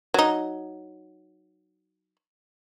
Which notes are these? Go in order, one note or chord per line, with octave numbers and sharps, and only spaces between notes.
F#3 D#4